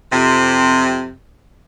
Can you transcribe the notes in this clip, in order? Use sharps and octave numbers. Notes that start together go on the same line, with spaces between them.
F2 C3